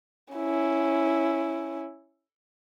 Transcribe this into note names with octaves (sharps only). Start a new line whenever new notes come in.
C#4 E4